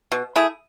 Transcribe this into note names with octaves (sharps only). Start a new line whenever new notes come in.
B2
A3 E4 G#4